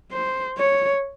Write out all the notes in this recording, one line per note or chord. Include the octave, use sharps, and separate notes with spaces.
C5
C#5